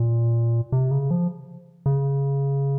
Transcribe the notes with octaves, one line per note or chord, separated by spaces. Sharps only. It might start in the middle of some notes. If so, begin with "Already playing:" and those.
Already playing: A#2
C3
C#3
F3
C#3